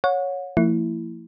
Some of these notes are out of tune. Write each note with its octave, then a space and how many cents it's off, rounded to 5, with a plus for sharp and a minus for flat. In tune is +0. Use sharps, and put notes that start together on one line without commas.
C#5 +0 F#5 -35
F3 -20 A#3 -40 E4 +0